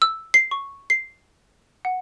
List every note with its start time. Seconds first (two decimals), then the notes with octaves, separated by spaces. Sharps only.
0.02 E6
0.34 C7
0.51 C#6
0.90 C7
1.85 F#5